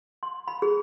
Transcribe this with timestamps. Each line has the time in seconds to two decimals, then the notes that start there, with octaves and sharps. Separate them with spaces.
0.23 C6
0.48 B5
0.62 G#4